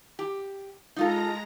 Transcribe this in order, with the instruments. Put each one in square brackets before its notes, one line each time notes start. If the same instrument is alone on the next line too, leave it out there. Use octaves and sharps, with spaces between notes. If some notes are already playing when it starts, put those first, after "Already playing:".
[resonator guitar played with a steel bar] G4
[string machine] G#3 A#5 A#6 [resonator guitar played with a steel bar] D#4 F4 A4